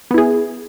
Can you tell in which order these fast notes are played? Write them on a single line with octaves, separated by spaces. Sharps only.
B3 E4 G#4